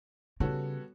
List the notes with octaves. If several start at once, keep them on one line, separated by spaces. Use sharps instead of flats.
C#3 G3 B3 F#4 A4 C#5